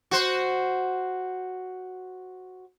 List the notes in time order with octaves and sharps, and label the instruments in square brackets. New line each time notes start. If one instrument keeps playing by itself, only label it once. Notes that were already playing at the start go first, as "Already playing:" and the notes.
[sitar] F#4 C5